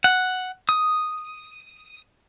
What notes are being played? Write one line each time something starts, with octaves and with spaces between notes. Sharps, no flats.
F#5
D#6